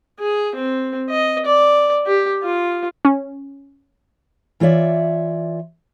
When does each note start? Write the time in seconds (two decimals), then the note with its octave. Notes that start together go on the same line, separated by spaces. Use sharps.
0.19 G#4
0.55 C4
1.09 D#5
1.45 D5
2.06 G4
2.43 F4
3.05 C#4
4.60 E3 F4 C#5 D5 E5